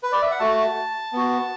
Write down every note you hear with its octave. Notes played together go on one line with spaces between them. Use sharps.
B4
D5
E5
F#5
A3 F#4 A5
B3 F#4